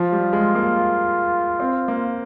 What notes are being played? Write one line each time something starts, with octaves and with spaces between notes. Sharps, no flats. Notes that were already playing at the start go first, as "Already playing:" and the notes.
Already playing: F3 F4
G3
G#3
A#3
C4
A#3